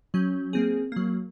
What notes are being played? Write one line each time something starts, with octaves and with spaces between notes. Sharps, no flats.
F#3 C#4 G6
A#3 C4 G#4
F#3 A#3